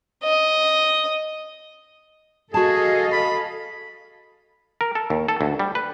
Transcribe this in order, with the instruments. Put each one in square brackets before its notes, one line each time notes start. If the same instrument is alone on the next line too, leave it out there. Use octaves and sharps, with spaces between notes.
[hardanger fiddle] D#5
[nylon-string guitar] F#4 A5 [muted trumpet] G#4 [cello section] A4 D#5 F5
[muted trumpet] B5
[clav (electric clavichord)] A#4
A4
D#2
A4
D2
G3
B4